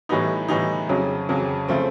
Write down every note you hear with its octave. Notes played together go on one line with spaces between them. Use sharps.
A2 E3 G3 B3 D#4
A2 E3 G3 B3 D#4
F2 C#3 F#3
F2 C#3 F#3
C#3 F3 A3 C4